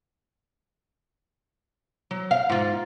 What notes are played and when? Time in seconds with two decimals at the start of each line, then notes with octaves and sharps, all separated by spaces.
2.11 F#3
2.31 F5
2.49 G#2 F4